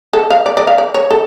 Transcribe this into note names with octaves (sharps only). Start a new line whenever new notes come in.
A4
F5
D5
D5
F5
D5
C#5
A4